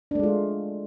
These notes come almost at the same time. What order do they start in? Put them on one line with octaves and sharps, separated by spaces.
D4 A3 G#3 F4